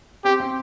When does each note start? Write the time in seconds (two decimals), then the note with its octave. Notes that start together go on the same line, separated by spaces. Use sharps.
0.25 C4 G4
0.40 C4